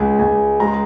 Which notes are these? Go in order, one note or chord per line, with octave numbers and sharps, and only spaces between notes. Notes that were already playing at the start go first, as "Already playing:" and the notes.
Already playing: C#2 G#5
C#2 G#5
G#3 A#5
C6